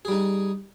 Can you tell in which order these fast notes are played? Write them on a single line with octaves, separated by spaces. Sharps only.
G#4 G3 D#4